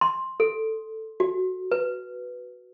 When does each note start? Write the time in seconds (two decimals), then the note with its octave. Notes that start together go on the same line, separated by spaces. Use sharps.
0.01 C6
0.40 A4
1.20 F#4
1.71 B4